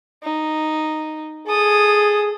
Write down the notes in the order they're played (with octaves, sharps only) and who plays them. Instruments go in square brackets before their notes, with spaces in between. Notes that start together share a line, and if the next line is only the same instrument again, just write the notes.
[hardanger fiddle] D#4
[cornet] G#4 [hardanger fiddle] A4 D#6